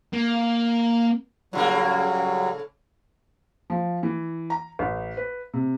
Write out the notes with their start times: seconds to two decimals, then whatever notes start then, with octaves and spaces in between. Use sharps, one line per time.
0.13 A#3
1.53 A2 C#3 F#3 G3 A#3
3.70 F3
4.03 E3
4.50 A#5
4.79 A1
5.17 B4
5.54 C3